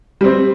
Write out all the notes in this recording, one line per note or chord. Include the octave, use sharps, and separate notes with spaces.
G3 C4